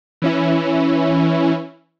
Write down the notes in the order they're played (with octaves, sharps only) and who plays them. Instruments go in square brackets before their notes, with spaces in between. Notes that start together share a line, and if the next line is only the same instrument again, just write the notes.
[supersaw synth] E3 C#4 E4